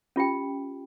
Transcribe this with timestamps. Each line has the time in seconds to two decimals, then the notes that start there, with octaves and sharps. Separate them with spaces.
0.16 C#4 F4 G4 G5